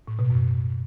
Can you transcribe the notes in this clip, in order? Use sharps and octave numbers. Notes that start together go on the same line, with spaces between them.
A2
B2
F#2